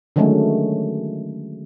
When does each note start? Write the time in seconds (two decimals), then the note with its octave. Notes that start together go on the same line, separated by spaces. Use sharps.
0.16 D3 D#3 F#3 G#3 A3 C#4